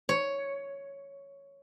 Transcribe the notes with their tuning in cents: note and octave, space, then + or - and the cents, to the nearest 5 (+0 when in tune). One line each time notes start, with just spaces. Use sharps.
C#5 +5